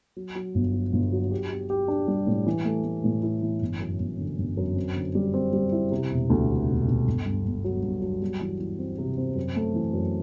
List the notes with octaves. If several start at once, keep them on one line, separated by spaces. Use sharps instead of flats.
F#3
F#3
G1
F#3
G1
F#3
G4
G4
G4
D4
G3
A2
E3
A3
A3
A2
E4
E3
G1
F#2
G1
D3
G1
F#2
C4
D3
G3
C4
G3
E4
C3
E1
D2
C3
E1
E1
G1
G2
G1
F#3
G2
F#3
G3
E3
E3
C4
C3
C4
F#2
A3
E3
F#2